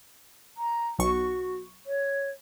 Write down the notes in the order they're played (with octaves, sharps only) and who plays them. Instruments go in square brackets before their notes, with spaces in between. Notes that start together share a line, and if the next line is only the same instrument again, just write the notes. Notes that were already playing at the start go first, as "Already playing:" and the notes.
[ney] A#5
[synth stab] B1 C#6 [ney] F#4
[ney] C#5